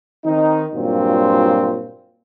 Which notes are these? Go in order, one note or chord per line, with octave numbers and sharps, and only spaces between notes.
D#3 C4 D#4
G2 A#2 F#3 C4 F4